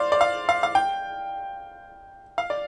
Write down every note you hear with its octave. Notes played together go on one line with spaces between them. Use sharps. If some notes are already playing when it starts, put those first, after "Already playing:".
Already playing: C5 D5 F5
D5
F5
F5
F5
G5
F5
D5